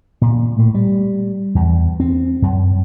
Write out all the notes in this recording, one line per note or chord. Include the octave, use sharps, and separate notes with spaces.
A#2
A2
G3
E2
C4
F#2